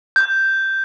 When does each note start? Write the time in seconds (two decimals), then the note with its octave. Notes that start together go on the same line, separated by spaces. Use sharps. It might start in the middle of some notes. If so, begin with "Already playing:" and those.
0.16 G6